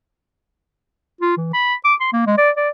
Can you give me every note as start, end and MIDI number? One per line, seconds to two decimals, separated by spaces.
1.21 1.37 65
1.37 1.49 52
1.53 1.75 83
1.84 1.94 86
2.00 2.11 84
2.13 2.22 58
2.27 2.33 56
2.38 2.50 74
2.57 2.69 74